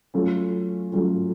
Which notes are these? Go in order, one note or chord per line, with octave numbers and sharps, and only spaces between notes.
F#3 A3 C#4 F4
F#3 A3 C#4 F4